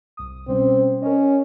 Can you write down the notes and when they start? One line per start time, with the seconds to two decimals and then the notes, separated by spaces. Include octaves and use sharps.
0.17 C2 D#6
0.48 B2 G3 C4 C#4
1.02 C#4 A#4 D#5